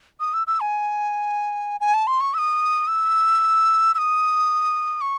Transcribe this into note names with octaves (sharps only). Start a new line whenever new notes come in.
D#6
E6
E6
G#5
G#5
A5
C6
C#6
E6
D#6
E6
E6
D#6
C#6